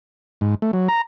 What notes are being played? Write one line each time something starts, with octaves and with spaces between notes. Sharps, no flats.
G#2
A3
F#3
A#5